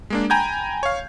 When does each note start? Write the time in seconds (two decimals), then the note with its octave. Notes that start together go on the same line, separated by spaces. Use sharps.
0.10 G#3 A#3 D4
0.30 G5 G#5 A#5 B5 G6 G#6
0.83 C#5 F5